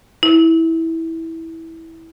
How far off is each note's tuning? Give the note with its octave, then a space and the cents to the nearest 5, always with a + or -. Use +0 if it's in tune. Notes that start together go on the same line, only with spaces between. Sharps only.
E4 -15